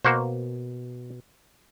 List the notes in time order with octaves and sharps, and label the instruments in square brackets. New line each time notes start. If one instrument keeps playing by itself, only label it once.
[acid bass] B2 [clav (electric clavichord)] A#3 F#4 C5